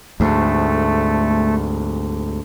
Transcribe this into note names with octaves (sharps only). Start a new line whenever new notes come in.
D2 G#2 A3